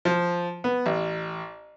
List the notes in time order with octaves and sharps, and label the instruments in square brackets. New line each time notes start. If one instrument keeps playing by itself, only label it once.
[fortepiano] F3
B3
A1